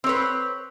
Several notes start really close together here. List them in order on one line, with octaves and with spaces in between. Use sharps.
C4 C#5 B4